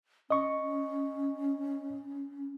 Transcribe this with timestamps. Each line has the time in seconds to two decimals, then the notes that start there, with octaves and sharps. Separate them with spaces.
0.30 C#4 D#5 C#6